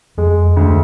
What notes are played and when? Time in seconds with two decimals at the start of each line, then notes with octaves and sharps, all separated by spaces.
0.17 F2 G#3
0.57 D2